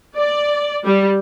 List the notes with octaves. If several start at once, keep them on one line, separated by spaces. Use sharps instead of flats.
D5
G3